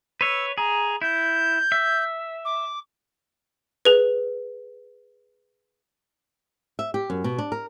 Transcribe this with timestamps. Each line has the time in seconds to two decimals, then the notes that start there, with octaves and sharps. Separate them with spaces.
0.21 B4 C#5 E6
0.58 G#4 A#5
1.02 E4 G6
1.72 E5
2.45 D6
3.85 G#4 B4
6.79 E5
6.94 G4
7.10 F#2
7.24 B2
7.38 D4
7.52 A#4